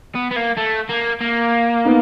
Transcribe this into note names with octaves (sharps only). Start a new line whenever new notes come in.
B3
B3
A#3
A3
A#3
A#3
B3 D#4